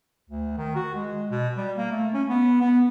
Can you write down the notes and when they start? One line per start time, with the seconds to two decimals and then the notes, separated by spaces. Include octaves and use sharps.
0.29 D2
0.57 D#3
0.76 F#4
0.95 G#3
1.30 B2
1.57 G3
1.77 A#3
1.92 A3
2.14 C#4
2.29 B3
2.61 B3